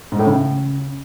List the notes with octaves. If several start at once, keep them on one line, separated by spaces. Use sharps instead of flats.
G#2
A2
C#3